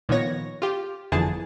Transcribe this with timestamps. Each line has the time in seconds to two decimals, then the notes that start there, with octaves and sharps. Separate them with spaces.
0.09 A#2 D#3 F3 B3 C#5 A#6
0.62 F4 G4
1.12 G1 F2 D3 E3 G#4 A5